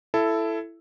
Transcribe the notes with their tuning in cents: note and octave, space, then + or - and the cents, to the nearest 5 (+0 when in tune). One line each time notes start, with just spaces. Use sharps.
E4 +15 A4 +0